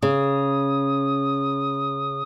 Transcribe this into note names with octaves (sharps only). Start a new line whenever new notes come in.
C#3 D#6